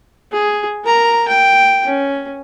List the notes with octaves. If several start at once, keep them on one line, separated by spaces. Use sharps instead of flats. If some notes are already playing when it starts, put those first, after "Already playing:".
G#4
A#4 A#5
G5
C#4